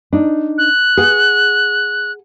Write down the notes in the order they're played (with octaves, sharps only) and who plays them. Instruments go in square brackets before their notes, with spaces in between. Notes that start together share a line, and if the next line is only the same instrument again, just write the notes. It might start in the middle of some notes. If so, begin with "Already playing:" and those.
[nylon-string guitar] D4 D#4
[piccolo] F#6
[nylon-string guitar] G#4 F#5